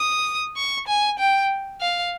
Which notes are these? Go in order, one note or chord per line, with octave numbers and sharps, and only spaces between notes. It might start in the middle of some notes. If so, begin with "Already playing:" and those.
Already playing: D#6
C#6
G#5
G5
F5